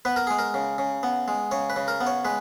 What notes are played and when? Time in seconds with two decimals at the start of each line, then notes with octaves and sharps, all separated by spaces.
0.05 B3 B4
0.16 A#4
0.27 G#3 G#4
0.39 A#4
0.54 C#3
0.78 C#3
1.03 B3
1.28 G#3
1.51 C#3 C#5
1.70 B4
1.76 C#3
1.88 A#4
2.01 B3
2.06 C#5
2.25 G#3 B4